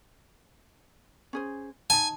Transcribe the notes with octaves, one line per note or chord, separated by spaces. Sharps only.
C#4 G#4 C5
D#4 G#5 A5